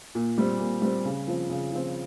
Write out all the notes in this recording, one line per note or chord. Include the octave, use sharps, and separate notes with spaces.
A#2
G3 C4
A#2
G3 C4
C#3
F3 C4
C#3
F3 C4